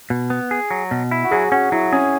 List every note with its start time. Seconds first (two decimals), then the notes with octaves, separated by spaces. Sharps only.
0.10 B2
0.30 B3
0.51 G#4
0.71 F#3
0.91 B2
1.11 E4
1.24 F#4
1.31 F#3 G#4
1.52 C#4 F#4
1.72 F#3 E4
1.93 C#4 G#4